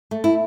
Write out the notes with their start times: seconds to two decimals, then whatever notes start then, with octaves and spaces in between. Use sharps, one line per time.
0.11 A3
0.24 E4